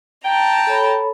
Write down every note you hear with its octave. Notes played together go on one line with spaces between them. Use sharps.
G5 A5 A#5
A4 C#5 B5